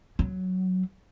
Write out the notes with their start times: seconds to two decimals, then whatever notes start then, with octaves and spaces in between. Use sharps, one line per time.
0.19 F#3